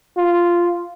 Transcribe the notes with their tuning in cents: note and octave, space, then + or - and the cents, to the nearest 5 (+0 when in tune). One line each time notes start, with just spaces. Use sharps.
F4 -5